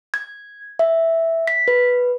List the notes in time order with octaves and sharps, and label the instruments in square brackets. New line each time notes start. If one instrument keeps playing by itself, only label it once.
[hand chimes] G#6
E5
B6
B4